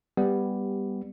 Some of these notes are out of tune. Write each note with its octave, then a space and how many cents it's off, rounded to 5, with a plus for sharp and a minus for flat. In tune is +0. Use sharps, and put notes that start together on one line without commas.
G3 +10 B3 +0 G4 +0